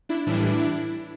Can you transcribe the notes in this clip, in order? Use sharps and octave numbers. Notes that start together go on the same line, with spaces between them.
D4 E4
A2 E3 G3 D4 E4